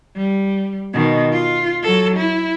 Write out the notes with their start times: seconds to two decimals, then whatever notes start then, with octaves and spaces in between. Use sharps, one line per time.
0.16 G3
0.93 B2 D#3
1.32 F4
1.83 F#3 A4
2.17 E4